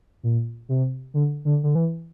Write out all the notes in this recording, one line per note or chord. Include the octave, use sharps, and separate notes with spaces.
A#2
C3
D3
D3
D3
E3